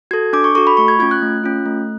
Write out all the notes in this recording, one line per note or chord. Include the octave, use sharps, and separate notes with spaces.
F#4 A4 G#6
D4 D6
C#6
F#4 A4 C#6
B5
A3 C#6
G#6
C#4 F4 G#6
F#6
A3
C#4 F4
A3